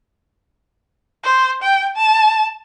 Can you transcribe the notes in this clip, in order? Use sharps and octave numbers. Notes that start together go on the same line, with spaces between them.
C5
G5
A5